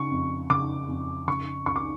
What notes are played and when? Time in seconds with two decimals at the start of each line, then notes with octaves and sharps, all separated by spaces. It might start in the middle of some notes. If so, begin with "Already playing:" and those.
Already playing: C#3 C#6
0.11 F2
0.50 C#3 D6
0.88 F2
1.27 C#3 C#6
1.66 C#2 C#6
1.76 D6